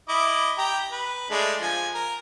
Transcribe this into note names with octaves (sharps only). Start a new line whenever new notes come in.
E4 D#5 D6
G4 A#5
B4
G#3 A3 D4
F3 G#5
A#4